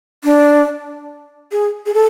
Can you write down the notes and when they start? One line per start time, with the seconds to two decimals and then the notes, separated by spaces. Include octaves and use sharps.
0.24 D4
1.52 G#4
1.86 G#4
1.94 A4